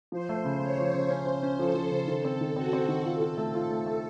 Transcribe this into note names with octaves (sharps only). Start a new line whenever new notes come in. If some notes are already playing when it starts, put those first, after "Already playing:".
F3 C5
A3
C#3
A3 C#5
F3
C#3
C#4 C5
C#4
C#4
F3 A4
F3
C#3
D#3
C4
D#3
C4 F#4
C4
D#3
F4 A4
F4
A3
F4 A4
A3
A3